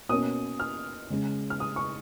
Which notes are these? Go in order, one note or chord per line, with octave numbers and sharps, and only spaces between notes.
B2 A#3 C#4 D#6
F6
C#3 G#3 C#4
F6
D#6
C#6